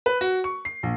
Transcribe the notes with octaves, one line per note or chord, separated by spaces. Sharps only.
B4
F#4
C#6
C7
A#1